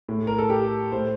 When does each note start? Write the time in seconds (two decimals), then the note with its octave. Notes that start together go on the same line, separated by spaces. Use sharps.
0.09 A2
0.27 A#4
0.38 A4
0.50 G4
0.92 A2 C5